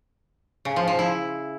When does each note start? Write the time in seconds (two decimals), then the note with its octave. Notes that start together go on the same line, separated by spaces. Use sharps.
0.65 C#3
0.76 F3
0.88 F3
0.99 E4